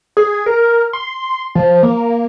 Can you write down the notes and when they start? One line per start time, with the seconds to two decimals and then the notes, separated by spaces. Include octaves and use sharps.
0.17 G#4
0.46 A#4
0.93 C6
1.55 F3
1.83 A#3